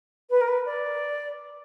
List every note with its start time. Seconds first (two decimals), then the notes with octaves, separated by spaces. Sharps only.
0.30 B4
0.41 A#4
0.48 B4
0.65 D5